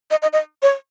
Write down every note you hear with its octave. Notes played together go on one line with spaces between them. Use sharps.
D#5
D#5
D#5
C#5